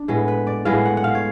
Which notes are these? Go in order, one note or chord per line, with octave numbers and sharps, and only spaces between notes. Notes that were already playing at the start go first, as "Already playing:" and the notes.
Already playing: D4
A2 G#3 B3
B4
D5
A2 G#3 B3 F5
F#5
F#5
F5
C#5